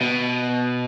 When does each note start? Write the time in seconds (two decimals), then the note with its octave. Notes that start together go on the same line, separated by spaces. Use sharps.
0.01 B2